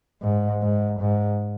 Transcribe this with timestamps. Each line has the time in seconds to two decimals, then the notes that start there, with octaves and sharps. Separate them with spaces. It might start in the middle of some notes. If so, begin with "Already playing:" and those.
0.22 G#2
0.62 G#2
1.00 G#2